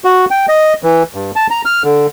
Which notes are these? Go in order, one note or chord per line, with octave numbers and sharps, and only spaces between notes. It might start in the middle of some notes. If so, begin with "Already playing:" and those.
F#4
G5
D#5
E3
G2
A5
A#5
F6
D3